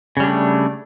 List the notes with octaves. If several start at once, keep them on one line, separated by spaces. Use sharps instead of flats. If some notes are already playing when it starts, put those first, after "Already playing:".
C#3 G3 A3 D4